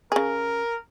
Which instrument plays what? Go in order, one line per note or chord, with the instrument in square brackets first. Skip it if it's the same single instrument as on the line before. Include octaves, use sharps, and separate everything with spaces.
[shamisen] C#3 G#4 [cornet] A#4